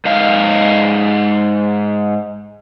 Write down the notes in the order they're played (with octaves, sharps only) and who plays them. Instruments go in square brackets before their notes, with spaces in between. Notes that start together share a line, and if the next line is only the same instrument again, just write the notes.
[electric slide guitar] G#2 D#5 F5